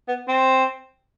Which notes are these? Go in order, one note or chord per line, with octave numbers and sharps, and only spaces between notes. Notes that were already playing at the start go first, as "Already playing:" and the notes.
B3
C4